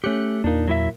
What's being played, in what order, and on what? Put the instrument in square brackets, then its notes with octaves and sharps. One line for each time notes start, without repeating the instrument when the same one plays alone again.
[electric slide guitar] A3 G4 [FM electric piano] C#4 F#6 C#7
[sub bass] E2 [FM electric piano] A#2 A#3 [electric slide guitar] D4 D#4
[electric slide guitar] F#3 E4 E5